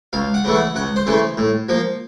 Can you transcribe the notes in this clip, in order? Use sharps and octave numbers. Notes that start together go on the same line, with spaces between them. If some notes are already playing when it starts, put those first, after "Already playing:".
C#2 F5
F#5
C#3 E3 A3
F#5
C#2 F#5
C5
C#3 E3 A3
A2
F3 A#3